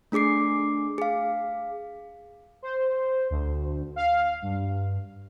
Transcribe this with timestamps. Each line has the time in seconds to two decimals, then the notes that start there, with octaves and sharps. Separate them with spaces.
0.12 A3 D4 G#4 D6 C7
0.98 G#4 F5
2.62 C5
3.30 D2
3.96 F5
4.42 G2